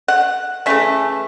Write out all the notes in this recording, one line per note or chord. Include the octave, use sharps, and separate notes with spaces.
F#5
C#3 E3 A3 C#4 E5